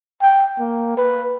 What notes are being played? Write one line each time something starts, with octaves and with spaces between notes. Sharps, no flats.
G5
A#3
B4